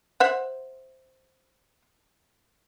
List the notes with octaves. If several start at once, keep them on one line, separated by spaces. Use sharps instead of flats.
C5 E5 F#5